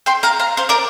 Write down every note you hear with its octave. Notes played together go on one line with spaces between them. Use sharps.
G5 C6
F5 A#5
F5 A#5
C5 F5
A#4 D5